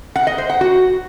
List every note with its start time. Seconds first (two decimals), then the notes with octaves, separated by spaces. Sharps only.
0.16 F#5
0.27 D#5
0.38 C5
0.50 F#5
0.61 F#4